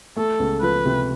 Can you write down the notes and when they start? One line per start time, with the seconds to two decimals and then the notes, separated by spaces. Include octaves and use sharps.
0.16 A3 A4
0.40 C#2
0.62 F3 B4
0.85 C3